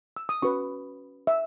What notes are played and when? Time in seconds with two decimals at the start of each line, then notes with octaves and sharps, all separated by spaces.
0.17 E6
0.29 D#6
0.42 C#4 F#4 B4 C#6
1.27 E5